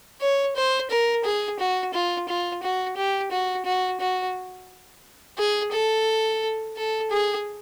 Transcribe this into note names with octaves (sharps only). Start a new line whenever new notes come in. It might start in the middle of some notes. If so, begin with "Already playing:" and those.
C#5
C5
A#4
G#4
F#4
F4
F4
F#4
G4
F#4
F#4
F#4
G#4
A4
A4
G#4